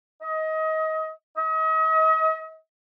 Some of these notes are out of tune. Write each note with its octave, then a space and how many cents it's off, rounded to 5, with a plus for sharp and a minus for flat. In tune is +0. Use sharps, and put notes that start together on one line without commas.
D#5 +25
D#5 +40